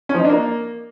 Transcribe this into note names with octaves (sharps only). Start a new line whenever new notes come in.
C#4
F3
D#4
D4
A#3